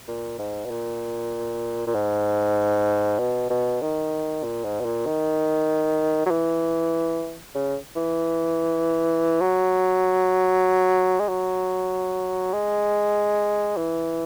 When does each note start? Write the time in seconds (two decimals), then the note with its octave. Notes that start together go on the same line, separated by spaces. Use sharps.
0.08 A#2
0.39 G#2
0.65 B2
0.70 A#2
1.87 A#2
1.94 G#2
3.19 B2
3.50 B2
3.81 D#3
4.44 A#2
4.64 G#2
4.80 B2
4.85 A#2
5.06 D#3
6.26 F#3
6.31 E3
7.55 C#3
7.96 E3
9.41 F#3
11.20 G#3
11.28 F#3
12.53 G#3
13.77 E3